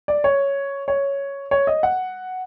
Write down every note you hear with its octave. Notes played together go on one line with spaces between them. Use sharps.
D5
C#5
C#5
C#5
D#5
F#5